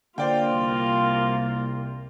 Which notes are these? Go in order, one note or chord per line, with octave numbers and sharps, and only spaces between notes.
D3 A#3 F4 C5 D5 G5
C2